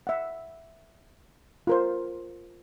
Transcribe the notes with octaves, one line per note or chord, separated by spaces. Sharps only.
E5 F#5
F4 A#4 C5